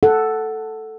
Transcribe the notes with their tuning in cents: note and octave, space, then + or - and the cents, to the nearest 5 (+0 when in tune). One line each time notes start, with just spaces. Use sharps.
A4 +0 F#5 +0